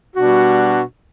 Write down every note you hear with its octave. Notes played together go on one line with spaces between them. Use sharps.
B2 G3 D4 F#4